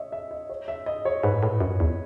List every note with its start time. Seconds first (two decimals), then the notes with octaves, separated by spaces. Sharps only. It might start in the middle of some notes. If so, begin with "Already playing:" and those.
Already playing: C#5 D#5 E5
0.12 E5
0.31 D#5
0.50 C#5
0.68 E5
0.86 D#5
1.05 C#5
1.23 G#2 B4
1.43 A2
1.60 F#2
1.80 E2